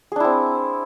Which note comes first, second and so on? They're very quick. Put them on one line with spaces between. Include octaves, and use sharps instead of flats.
G#4 D4 E4 C4